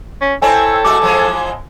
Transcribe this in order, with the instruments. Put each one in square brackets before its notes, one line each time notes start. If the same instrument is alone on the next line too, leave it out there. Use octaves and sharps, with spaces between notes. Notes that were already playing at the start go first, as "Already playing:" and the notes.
[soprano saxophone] C#4
[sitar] C4 E4 C#5 [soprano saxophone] A4 [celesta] G#5
[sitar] G#3 A3 F#4 [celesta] D6
[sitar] E3 F3 G#3